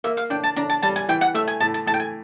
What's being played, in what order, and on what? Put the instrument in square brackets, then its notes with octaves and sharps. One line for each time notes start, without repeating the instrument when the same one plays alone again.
[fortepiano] A#3 [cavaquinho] E5
[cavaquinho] F5
[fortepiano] D4 [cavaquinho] G5
[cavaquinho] A5
[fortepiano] D4 [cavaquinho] A#5
[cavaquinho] A5
[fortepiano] G3 [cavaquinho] A5
[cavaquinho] G#5
[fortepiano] E3 [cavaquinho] G5
[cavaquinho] F#5
[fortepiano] A3 [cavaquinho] E5
[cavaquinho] G#5
[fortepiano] A2 [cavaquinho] A5
[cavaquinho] A5
[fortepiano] A2 [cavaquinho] A5
[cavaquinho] G5
G#5